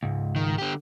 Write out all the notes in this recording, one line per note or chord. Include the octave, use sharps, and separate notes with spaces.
C#2 G#2
D#3
D3 G4